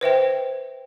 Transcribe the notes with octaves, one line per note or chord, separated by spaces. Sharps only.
B4 C5 E5 G5